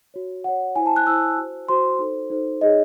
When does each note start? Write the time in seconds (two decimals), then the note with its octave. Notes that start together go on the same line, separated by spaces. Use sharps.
0.14 F#4 C#5
0.44 F#4 C#5 F#5
0.76 E4 C5 G#5
0.86 A5
0.96 F#6
1.07 E4 C5 E6
1.37 F#4 C5
1.69 F#4 C5 C6
1.99 D#4 A4 C5
2.30 D#4 A4 C5
2.61 D#4 G#4 C#5 D#5